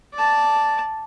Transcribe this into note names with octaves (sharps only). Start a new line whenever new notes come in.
D5 A5